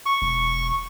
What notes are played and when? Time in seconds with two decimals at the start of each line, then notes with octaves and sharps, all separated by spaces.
0.06 C#6
0.22 E1